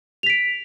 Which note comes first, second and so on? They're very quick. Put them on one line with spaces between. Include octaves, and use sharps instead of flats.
F7 B6 D7